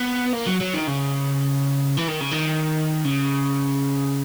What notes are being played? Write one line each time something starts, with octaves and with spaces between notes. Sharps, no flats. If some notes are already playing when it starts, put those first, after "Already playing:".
Already playing: B3
A#3
F#3
F#3
D#3
C#3
E3
D#3
C#3
D#3
C#3